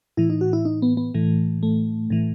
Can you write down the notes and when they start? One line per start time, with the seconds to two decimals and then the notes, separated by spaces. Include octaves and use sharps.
0.17 A2 E3 E4
0.30 D#4
0.41 F#4
0.53 E4
0.65 D#4
0.82 B3
0.97 B3
1.14 A2 E3 A3
1.63 A3
2.10 A2 E3